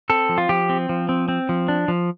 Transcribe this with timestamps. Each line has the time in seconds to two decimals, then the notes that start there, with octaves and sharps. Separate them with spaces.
0.10 C4 A4
0.29 F3
0.38 F4
0.49 F3 G4
0.69 C4
0.89 F3
1.09 C4
1.28 C4
1.49 F3
1.68 D4
1.88 F3